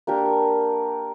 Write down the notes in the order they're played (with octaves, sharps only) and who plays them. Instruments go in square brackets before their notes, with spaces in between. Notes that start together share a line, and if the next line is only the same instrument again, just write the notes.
[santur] A#3 D4 G4 A#4